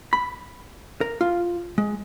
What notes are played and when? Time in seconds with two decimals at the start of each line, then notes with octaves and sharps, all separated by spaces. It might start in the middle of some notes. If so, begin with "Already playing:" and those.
0.13 B5
1.01 A#4
1.21 F4
1.78 G#3